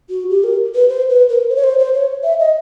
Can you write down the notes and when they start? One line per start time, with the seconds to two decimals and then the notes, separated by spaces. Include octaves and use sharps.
0.10 F#4
0.30 G4
0.44 A#4
0.75 B4
0.89 C5
1.09 B4
1.29 A#4
1.49 C5
1.56 C#5
1.64 C5
1.79 C5
1.94 C#5
2.24 E5
2.40 D#5